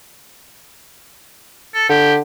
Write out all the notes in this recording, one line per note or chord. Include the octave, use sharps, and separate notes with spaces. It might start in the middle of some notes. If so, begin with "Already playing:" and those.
A4
D3 G4